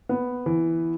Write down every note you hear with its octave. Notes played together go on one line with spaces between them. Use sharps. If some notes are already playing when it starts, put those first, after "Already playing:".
B3
E3